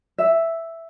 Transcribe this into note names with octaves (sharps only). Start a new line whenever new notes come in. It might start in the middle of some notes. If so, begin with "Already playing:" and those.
E5